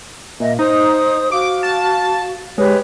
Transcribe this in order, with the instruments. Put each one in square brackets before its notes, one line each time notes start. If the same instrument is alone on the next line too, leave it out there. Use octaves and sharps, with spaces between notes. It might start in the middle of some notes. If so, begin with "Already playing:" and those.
[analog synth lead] A#2 [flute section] D#5 E5
[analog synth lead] D#4 [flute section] C5 D#6
[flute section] F#4 F5 [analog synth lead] D6
[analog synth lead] A5
[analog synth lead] G#3 [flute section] G4 B4 C#5